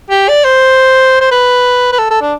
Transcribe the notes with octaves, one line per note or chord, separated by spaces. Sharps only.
G4
D5
C5
C5
B4
B4
A4
A4
D4